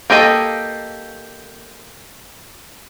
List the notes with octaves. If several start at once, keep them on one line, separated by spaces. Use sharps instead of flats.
A#3 G4 A4 D#5